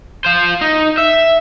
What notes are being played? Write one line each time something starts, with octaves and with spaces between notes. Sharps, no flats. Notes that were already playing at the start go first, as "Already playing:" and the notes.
F4 C5
D#4
E5